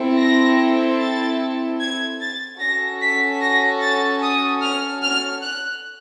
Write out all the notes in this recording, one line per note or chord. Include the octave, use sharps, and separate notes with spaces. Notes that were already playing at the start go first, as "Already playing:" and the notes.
Already playing: C4 E4 A4
A#6
A6
G#6
A6
C#4 F#4 A4 A#6
B6
A#6
A6
D#6
F6
F6
F#6